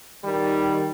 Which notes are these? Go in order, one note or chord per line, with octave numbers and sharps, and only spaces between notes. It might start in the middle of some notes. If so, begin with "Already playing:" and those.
D#3 G3